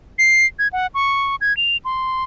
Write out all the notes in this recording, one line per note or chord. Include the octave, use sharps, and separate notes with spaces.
C7
G#6
F#5
C#6
G#6
F7
C6